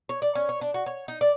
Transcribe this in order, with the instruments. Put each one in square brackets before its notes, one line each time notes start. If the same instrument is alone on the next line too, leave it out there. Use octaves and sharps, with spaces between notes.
[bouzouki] C#5
D5
C#4
C#5
D4
F#4
C#5
D#4
D5